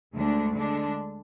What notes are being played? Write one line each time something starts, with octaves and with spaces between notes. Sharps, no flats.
D2 D3 G#3 D4
D3 G#3 D4